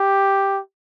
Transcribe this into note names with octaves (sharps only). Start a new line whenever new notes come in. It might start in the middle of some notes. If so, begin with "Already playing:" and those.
Already playing: G4